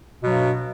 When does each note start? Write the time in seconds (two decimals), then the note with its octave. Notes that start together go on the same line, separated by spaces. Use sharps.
0.23 B2
0.26 F#3
0.30 G2